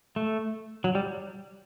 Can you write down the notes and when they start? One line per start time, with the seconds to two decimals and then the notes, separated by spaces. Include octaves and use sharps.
0.16 A3
0.84 F#3
0.95 G3